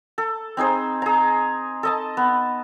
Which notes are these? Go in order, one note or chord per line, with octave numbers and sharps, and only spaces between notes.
A4
C4 D#4 G#4 C5
G#4 A#5
A4 D#5 A5
B3